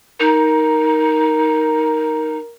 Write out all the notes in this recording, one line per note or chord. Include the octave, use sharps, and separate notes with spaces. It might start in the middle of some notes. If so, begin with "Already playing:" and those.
D#4 A#4